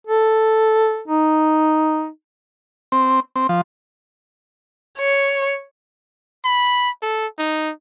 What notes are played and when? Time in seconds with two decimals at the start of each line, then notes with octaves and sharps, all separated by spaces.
0.07 A4
1.08 D#4
2.92 C4
3.36 C4
3.49 F3
4.99 C#5
6.45 B5
7.02 A4
7.38 D#4